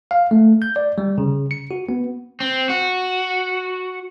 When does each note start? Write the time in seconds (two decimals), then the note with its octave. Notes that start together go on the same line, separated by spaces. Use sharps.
0.11 F5
0.31 A3
0.62 G6
0.76 D5
0.98 G3
1.18 C#3
1.51 C#7
1.71 F#4
1.89 B3
2.40 C4
2.70 F#4